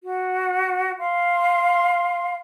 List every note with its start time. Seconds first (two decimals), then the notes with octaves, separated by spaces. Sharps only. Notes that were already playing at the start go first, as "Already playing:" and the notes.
0.05 F#4
0.99 F5 C6